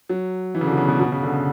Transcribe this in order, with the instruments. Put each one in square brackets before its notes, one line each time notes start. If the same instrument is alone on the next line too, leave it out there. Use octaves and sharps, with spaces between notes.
[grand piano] F#3
E3
C#3
D3
B2
C#3
B2
B2
C#3
D3
C#3